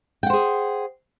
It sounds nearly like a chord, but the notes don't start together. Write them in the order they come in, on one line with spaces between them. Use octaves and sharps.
G5 F#5 C5 G#4